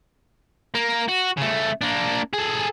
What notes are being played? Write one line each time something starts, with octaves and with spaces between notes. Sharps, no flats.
A#3
F#4
C#3 A3
A#3 D4
G#4 A4